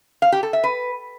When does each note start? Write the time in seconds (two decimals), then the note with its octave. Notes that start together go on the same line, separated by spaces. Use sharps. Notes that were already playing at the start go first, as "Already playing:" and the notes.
0.22 F5
0.32 G4
0.43 A4
0.53 E5
0.64 B4